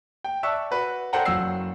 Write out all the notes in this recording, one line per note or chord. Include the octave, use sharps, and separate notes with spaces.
G5
D5 E5 A5 C#6 E6 F#6
F#4 B4
A4 C5 D5 F#5 G5 A#5
F#1 F#3 F#5 E6 C7